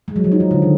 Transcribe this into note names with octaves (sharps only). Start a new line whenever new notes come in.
G#3
F#3
F3
D#4
F3
D3
D#3